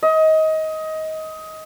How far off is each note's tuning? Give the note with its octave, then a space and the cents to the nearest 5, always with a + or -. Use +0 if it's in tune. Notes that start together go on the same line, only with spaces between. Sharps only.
D#5 +20